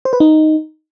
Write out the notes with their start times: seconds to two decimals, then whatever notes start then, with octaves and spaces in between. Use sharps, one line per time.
0.05 C5
0.13 B4
0.20 D#4